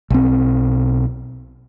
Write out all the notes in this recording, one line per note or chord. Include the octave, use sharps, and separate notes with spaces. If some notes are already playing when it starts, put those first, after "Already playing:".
B1 C4